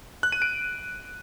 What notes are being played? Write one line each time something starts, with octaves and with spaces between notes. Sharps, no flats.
F#6
D#7
D7